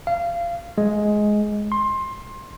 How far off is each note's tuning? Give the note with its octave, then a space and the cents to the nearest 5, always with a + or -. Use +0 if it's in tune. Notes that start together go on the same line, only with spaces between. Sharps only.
F5 -25
G#3 +10
C6 +20